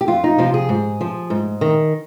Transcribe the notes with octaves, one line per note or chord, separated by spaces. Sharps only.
G4
F2 F4
D#4
C3 F3 F4
G#4
G#2
F3
G#2
D#3